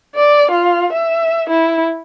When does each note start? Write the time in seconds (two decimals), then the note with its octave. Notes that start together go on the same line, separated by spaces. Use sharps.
0.15 D5
0.51 F4
0.93 E5
1.50 E4